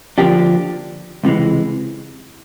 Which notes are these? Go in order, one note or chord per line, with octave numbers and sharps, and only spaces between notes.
D3 F3 A#3 D4 G4
C#2 C3 E3 G#3